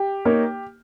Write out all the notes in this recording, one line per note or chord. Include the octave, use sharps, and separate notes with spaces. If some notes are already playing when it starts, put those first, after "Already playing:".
Already playing: G4
A#3 D#4 A#4 C#5